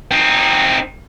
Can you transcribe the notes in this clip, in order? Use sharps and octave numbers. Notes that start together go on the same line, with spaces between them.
C4 D#4